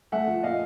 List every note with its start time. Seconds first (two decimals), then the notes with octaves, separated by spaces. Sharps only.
0.12 A3 E5 F#5
0.27 F3
0.43 A#2 D#5 F5